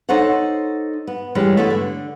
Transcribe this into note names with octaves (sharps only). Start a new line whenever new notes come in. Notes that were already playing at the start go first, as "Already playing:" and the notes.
D#4 A4 C5 C#5 F#5
B3
E3 G3 G#3 C#4
A3 B3 E4
D3